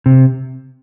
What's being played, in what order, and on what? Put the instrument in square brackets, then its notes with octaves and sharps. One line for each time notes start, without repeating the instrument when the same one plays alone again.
[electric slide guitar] C3